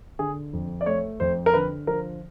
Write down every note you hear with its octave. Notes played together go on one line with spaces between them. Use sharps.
D3 G#4
F2
D5
A3 C#5
F2 C5
A#4
D3 B4
F3 A#4